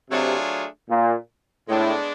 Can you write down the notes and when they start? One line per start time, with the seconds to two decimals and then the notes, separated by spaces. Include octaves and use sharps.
0.11 C3 F#3 A3 D4 F4 G#4
0.90 A#2
1.69 A2 G#3 B3 D4